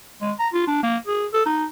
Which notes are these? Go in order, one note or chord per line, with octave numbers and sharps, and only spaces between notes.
G#3
A#5
F4
D4
A#3
G#4
A4
D#4